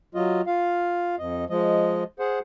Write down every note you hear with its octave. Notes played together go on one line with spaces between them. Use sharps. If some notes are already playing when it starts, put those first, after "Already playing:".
F#3 F4 D#5
F4 F5
F2 D#5
F3 G#3 D#5
G#4 C5 F#5